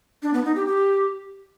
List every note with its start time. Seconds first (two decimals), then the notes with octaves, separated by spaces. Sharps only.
0.23 D4
0.34 B3
0.45 D#4
0.56 G4
0.67 G4